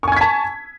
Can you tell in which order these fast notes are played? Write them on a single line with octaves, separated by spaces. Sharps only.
C#6 G#5 G#6 B6 A5